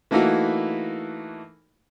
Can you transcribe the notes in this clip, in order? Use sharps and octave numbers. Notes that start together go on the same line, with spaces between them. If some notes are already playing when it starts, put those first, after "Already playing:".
E3 A3 A#3 D#4 E4 F#4